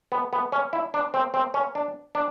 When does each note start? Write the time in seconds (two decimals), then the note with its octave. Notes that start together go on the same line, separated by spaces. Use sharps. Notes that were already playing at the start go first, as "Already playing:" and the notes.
0.12 B3
0.33 B3
0.52 C#4
0.73 E4
0.94 D4
1.14 C4
1.34 C4
1.54 C#4
1.75 D4
2.15 D4